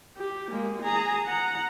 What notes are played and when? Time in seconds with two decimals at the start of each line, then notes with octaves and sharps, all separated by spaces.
0.17 G4
0.50 G#3 A#3
0.82 G#4 A#5
1.26 F#5 A#5